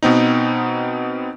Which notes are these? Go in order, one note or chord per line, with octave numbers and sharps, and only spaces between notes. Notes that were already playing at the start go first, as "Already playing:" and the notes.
B2 B3 C4 D#4